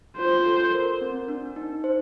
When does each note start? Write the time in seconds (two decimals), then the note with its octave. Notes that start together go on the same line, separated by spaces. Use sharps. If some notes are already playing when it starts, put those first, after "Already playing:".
0.18 F4 C5
0.46 A4
0.73 A#4
1.01 C4
1.28 D4
1.56 D#4
1.84 C5